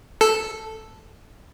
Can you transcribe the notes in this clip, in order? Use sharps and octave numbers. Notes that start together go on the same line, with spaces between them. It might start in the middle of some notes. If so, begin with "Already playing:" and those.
A4